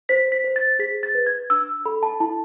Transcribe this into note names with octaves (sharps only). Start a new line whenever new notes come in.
C5 B6
B6
C5
A6
G#4 B6
A6
B4
G#6
D4 E6
A4 B5
A5
E4 A5